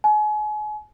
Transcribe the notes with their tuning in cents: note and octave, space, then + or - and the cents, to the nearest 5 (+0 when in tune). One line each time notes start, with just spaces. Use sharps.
G#5 +35